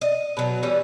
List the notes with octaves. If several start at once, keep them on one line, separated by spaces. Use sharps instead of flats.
D#5
B2 F#3
E3 G3 C#4